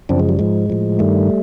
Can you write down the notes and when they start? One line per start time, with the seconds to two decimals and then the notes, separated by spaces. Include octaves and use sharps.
0.09 F#2 C#3 F3 C4 D4
0.20 G#3
0.29 G3
0.39 G#2 F3 G#3
0.70 A2 F3
0.99 G2 D#3 G3 A3